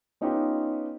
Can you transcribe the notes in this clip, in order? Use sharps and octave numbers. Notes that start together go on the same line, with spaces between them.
B3 C#4 D#4 F4 G4 B4